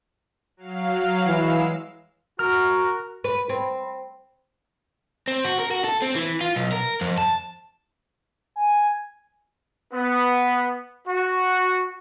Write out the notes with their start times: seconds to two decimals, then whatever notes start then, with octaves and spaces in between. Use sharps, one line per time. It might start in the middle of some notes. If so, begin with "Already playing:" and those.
0.57 F#3 F5
1.27 E3 G#3 E6 C7
2.39 F#4 A#4 F6
3.24 B4
3.49 C4
5.28 C4
5.45 F#4
5.60 A#4
5.71 F#4
5.84 A4
6.02 C4
6.16 E3
6.41 F4
6.56 B1
6.72 A#4
7.01 F2
7.18 A5
8.56 G#5
9.93 B3
11.07 F#4